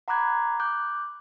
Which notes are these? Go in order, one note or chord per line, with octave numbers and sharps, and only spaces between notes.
F#5 A#5 B5 D6 F#6 G#6
D6 F#6 G6